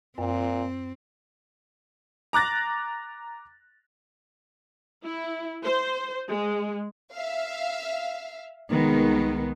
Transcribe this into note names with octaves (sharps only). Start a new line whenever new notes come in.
F#2 A#2 C4
A#5 D6 F#6 A6 A#6
E4
C5
G#3
E5 F5
C2 D#3 G#3 B3